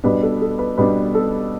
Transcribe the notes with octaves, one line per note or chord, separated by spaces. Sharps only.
B2 G3 B3 D4 B4
A4
A4
B4
B2 G3 B3 D4 B4
A4